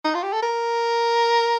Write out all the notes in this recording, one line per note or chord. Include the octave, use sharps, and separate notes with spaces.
D#4
F4
G4
A4
A#4